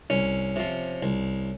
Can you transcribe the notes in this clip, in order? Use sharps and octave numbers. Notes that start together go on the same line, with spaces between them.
C2 C#4
C3 F3
C2